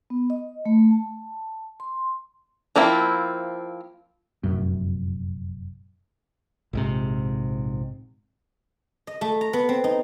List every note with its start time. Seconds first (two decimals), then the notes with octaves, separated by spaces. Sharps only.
0.10 B3
0.30 D#5
0.66 A3
0.91 A5
1.80 C6
2.76 F3 A#3 C4 E4
4.44 F1 A#1 F#2
6.73 A#1 G#2 C3
9.07 D#5
9.21 A3
9.41 A#5
9.53 B3
9.69 C4
9.84 D#4